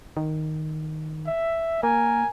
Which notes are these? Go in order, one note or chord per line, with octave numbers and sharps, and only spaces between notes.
D#3
E5
A#3 A#4 G#5